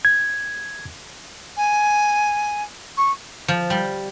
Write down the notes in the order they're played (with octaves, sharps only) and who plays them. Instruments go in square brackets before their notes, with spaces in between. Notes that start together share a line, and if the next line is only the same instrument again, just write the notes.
[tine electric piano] G#6
[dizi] G#5
C#6
[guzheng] F3
G3